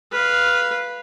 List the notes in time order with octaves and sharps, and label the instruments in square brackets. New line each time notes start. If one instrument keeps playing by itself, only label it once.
[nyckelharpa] B4 F5